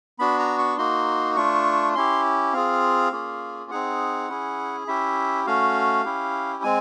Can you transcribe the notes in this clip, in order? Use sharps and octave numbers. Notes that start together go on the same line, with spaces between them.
B3 D4 F#4 B5
A#5
C#6
A#3 D#4 F#4 C6
A3 D4 F4 C#6
C#4 E4 G4 C6
C4 F4 G#4 F5
A#3 C#4 F4 G#4
C4 D#4 G#4 F#5
C#4 E4 G#4
C#4 E4 G4 E5
A3 C#4 F#4 F5
C#4 E4 G4
G#3 C4 G#5